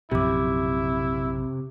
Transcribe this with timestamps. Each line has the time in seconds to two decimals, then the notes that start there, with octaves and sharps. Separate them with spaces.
0.11 A#1 F#2 C3 E4 G4 D6